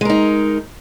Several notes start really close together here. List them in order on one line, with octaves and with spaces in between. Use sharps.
G#3 A#4 D#4